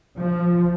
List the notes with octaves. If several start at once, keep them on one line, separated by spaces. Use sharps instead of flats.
F3